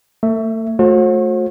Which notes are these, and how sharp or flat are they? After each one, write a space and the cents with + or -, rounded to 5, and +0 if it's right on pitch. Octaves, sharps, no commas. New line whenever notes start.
A3 +35 E5 +0
A3 -10 F#4 -40 C5 +45